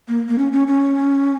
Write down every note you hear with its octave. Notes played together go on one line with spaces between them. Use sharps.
A#3
A#3
C#4
C#4
C#4